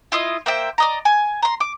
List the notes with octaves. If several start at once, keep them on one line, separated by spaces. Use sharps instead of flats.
E4 F4 D#5
A#3 C5 E5 G5
D5 D#5 A#5
G#5
A#5 C6
D6